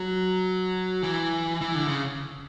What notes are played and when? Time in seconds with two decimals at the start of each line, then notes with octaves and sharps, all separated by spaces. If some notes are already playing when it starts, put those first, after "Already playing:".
Already playing: F#3
1.03 E3
1.61 E3
1.75 D3
1.88 C#3